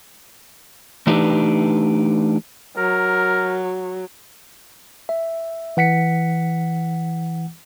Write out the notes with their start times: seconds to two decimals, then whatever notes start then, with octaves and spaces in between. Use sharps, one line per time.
1.07 E3 A3 D4 D#4 G4 B4
2.77 F#3 A#4
5.09 E5
5.77 E3 F#5 B6 C#7